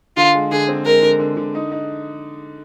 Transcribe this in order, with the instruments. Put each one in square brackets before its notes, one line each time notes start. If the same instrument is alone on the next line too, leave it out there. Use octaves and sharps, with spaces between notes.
[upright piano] D3 [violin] F4
[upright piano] G#3
[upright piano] D3 [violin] G#4
[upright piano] C4
[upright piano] G#3 [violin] A#4
[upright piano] D3
D3
D3
D#4
D#4